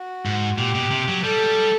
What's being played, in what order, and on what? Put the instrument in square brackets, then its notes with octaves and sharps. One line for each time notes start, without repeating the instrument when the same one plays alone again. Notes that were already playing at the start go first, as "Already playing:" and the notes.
Already playing: [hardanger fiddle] F#4
[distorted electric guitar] G#2
[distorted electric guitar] A#2 [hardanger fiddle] G4
[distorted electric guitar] B2
C3
F#3
[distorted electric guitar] G3 [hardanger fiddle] A4